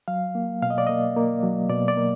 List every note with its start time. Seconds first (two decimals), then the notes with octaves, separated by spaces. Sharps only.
0.08 F#3 F5
0.35 A#3
0.62 B2 F5
0.70 D#5
0.78 D5
0.87 A#3 D#5
1.17 A#3
1.43 F#3
1.70 B2 D5
1.88 D5
1.97 A#3